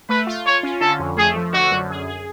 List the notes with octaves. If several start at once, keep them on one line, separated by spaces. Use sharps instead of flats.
A3 B4
F4
F4 C#5
C#4
D3 A4
F2
A3 G#4
F3
D3 F#4
F#2
G#4
G#4